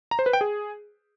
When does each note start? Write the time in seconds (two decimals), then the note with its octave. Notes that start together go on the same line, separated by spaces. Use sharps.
0.11 A#5
0.19 C5
0.26 B4
0.33 G5
0.41 G#4